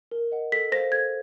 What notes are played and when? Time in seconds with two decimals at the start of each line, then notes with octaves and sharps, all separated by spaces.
0.11 A#4
0.32 D#5 F#5
0.52 A4 B6
0.72 C5 F5 A#6
0.92 A4 G#6